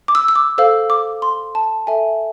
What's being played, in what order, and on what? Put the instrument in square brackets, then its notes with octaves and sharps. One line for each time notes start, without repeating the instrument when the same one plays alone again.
[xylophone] D6
E6
E6
D6
A4 C5 F5 E6
D6
C6
A5
A4 E5 G#5